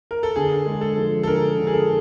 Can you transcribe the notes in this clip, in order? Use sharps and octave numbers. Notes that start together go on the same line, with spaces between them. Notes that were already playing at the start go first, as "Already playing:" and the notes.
A#4
A4
D3 G#4
G#3
A4
F3
A4
D3 A#4
D3
G#4
A4